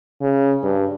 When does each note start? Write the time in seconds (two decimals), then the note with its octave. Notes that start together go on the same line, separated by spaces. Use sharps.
0.22 C#3
0.64 G2